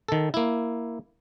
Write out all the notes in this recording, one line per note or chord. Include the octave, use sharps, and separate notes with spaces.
D#3 A4
A#3 E4